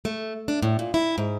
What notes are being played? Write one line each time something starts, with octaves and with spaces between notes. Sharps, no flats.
A3
D4
A2
A#2
E4
G#2